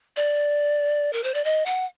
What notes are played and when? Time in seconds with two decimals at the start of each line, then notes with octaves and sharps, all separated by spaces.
0.17 D5
1.13 A#4
1.24 C5
1.34 D5
1.44 D#5
1.66 F#5